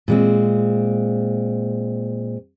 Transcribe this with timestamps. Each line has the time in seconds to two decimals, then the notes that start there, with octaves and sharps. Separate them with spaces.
0.08 A#2 G#3 C4